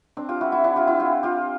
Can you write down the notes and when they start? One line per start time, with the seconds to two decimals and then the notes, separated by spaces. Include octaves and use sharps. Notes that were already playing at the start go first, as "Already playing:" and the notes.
0.17 C4 D4
0.29 F4 G4
0.41 E4 F#4
0.52 E4 F#4
0.64 D4 E4
0.76 F4 G4
0.87 E4 F#4
1.00 F4 G4
1.23 F4 G4